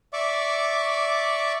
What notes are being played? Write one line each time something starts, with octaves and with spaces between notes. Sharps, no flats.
D5 E5 C#6 D6